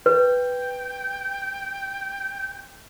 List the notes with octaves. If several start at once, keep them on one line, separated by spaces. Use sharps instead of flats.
B4 G5